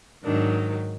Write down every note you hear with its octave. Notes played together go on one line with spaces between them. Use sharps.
G#2 D#3 F#3 D4